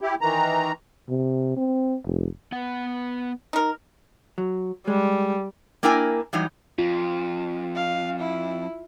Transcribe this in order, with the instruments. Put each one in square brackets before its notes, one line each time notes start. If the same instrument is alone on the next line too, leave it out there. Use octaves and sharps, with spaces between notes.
[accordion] E4 G4
D#3 E3 A#5
[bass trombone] C3
C4
F1
[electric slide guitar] B3 B4 F#5
[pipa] D#4 A#4
[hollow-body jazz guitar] F#3
[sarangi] G3 [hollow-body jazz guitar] G#3
[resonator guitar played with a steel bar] A#3 D4 E4 A#4 G5 G#5
E3 F#3 G3 D#4
[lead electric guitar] F2 [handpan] F4
[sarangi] F5
E4